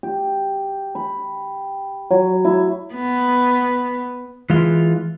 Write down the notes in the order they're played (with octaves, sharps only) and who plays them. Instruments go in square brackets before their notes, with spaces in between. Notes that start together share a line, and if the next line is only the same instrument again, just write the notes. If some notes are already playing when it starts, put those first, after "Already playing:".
[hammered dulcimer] G4
B5
F#3
E4
[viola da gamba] B3
[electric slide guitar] E3 G#3 F4